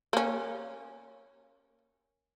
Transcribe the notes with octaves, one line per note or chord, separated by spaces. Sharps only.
A#3 C#4